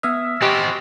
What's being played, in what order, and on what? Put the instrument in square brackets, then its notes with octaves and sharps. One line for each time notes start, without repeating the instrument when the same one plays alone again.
[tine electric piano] B3 D#6 F6 [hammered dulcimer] E5
[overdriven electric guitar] C4 F#4 [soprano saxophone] G4 [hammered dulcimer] D#5 [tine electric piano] G#5 B5